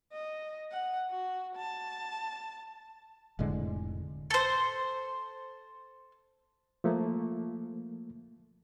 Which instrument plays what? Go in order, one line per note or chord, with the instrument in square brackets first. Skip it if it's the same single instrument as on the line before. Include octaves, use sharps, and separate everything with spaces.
[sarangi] D#5
F#5
F#4
A5
[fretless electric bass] F1 A2 D3 G#3
[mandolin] A4 C5
[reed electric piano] F3 A3 A#3